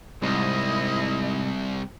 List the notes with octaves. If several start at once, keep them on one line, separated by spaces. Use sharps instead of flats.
C2 G#2 C3 G3 E4 D#5